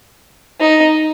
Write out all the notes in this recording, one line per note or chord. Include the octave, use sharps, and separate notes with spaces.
D#4